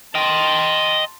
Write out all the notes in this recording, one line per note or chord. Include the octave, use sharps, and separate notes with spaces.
D#5 G5 A5 C6